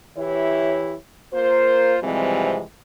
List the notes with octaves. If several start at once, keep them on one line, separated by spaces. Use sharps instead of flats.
E3 E4 G4 C#5
A#3 F4 A#4 C5
C3 E3 F3 G3 G#3 C4